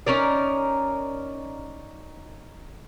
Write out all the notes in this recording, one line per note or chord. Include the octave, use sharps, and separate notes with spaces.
C#4 D#4 A#4 D5